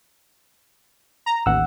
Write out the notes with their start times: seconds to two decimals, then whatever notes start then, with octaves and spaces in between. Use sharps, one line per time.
1.26 A#5
1.46 A1 D#2 F#5 E6